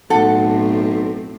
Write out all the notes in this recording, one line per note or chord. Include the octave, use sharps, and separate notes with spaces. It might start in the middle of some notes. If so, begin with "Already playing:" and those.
B1 A2 C4 A4 F#5